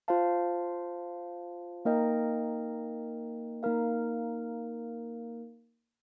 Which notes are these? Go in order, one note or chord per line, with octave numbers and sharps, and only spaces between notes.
F4 C5 F5 A5
A#3 D#4 A#4 D#5 G5
A#3 D#4 A#4 F5